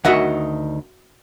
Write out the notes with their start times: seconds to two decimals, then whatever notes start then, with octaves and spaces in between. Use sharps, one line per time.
0.05 D2 D#3 F#4 D#5 E5 F#5